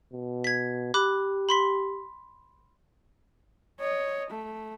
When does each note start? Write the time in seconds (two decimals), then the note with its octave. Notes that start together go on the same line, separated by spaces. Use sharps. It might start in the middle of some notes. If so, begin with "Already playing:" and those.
0.12 B2
0.44 G#6 B6
0.94 G4 B5 D6 F#6
1.49 B5 C6 B6
3.80 C#5 D#5
4.31 A3